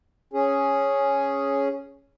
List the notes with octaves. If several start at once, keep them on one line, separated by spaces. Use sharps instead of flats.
C#4 G#4